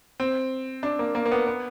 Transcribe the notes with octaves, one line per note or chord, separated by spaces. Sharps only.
C4
D4
A#3
A#3
A#3
B3
B3